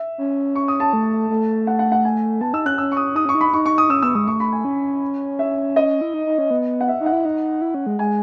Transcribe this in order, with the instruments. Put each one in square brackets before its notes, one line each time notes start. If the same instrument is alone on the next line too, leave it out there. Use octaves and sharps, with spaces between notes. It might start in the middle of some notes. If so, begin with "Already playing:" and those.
Already playing: [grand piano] E5
[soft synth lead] C#4
[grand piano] C#6
D#6
A5
[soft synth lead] A3
A3
[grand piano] F#5
F#5
F#5
G#5
[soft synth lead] B3 [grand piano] A5
[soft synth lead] D#4 [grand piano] E6
[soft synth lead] C#4 [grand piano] F#6
[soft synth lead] C#4 [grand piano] E6
[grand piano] C#6
D#6
[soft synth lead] D#4 [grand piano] D#6
[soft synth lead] C#4 [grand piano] C#6
[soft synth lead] D#4
[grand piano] B5
[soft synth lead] D#4 [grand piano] C#6
[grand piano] C#6
D#6
[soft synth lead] C#4 [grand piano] E6
[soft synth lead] B3 [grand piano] E6
[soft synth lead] G#3 [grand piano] D#6
[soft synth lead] A3 [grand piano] C#6
[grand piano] B5
G#5
[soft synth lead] C#4
[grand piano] E5
D#5
[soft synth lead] E4
D#4
D#4
C#4
B3
[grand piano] F#5
E5
[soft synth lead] D#4
[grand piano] F#5
[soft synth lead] E4
D#4
E4
C#4
G#3
[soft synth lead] G#3 [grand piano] G#5